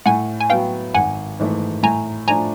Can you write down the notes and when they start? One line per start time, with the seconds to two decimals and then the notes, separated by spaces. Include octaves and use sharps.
0.06 A2 F#5 G#5
0.40 G#5
0.50 F#3 B3 F5 G5
0.94 G#1 F#5 G#5
1.39 G#2 E3 A3
1.83 A2 G#5 A#5
2.27 F3 A3 D4 F4 G#5 A#5